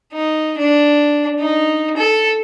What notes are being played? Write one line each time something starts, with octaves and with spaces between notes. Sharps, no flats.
D#4
D4
D#4
A4